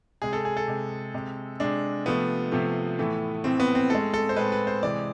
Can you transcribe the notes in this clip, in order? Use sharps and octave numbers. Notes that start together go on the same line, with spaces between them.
C3 G#3 G#4
A4
G#4
A4
C3 G#3
C3 G#3
C3 G#3 D4
C3 F3 A3 B3
C3 F3 A3
A2 E3 A3
A2 E3 A3 C4
B3
C4
A2 G#3 A4
A4
C5
A2 G#3 B4
B4
C5
C3 E3 G#3 D5